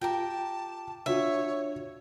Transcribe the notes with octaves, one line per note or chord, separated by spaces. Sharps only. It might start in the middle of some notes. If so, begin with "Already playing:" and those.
F4 G4 A#4 G5 A5
D4 F4 F#4 C#5 E5